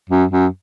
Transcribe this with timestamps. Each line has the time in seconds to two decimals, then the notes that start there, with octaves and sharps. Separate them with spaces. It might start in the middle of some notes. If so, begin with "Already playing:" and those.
0.10 F#2
0.31 F#2